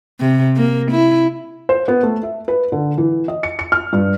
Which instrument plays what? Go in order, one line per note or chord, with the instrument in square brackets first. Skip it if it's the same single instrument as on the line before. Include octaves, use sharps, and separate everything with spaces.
[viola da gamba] C3
A#3
E4
[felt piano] C5
B3
A3
E5
B4
D3
E3
D#5
C#7
C#7
F6
G2